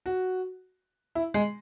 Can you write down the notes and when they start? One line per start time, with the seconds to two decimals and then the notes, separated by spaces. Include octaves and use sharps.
0.06 F#4
1.15 E4
1.34 G#3